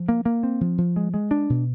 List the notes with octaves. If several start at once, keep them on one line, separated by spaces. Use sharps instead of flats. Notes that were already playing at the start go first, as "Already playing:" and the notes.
Already playing: F3
A#3
A#3
C4
F3
F3
G#3
G#3
D4
B2